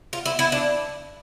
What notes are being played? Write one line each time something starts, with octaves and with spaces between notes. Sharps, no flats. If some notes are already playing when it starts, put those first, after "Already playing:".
F4
E4
E4
D4